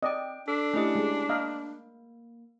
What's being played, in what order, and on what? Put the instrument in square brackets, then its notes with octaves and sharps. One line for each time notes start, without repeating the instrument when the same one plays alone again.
[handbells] C4 G5 [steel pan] D5 D#5
[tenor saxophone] D4 [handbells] A4
[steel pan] A3 D#5 [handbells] C#4 E4 G4
[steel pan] G#3
[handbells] A#3 [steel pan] D#5 F5 A#5